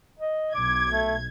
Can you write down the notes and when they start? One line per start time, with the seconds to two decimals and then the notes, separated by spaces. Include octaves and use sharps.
0.19 D#5
0.55 B1 D6 G#6
0.92 A3